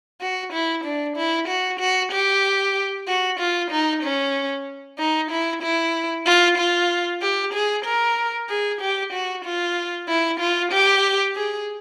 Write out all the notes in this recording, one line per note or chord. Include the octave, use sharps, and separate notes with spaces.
F#4
E4
D4
E4
F#4
F#4
G4
F#4
F4
D#4
C#4
D#4
E4
E4
F4
F4
G4
G#4
A#4
G#4
G4
F#4
F4
E4
F4
G4
G#4